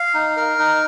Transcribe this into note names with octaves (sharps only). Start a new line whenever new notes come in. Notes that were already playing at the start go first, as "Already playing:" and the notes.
Already playing: F5
D#4
A#4
D#4